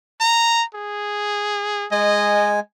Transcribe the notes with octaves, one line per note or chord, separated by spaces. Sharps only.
A#5
G#4
G#3 D#5 G#5